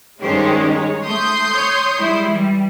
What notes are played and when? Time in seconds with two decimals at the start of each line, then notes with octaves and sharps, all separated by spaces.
0.21 G2 D#3 G#3 C#4 G4 C5
0.73 C#5
1.05 A3 C6 D#6 G6
1.53 C#5
1.98 G3 G#3 E4
2.30 E3 G3